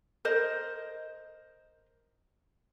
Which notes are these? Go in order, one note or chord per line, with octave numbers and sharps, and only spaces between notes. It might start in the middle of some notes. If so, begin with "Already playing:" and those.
A#4 C5 D#5